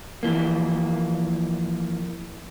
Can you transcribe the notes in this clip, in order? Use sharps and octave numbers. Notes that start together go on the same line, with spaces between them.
F2 E3 A#3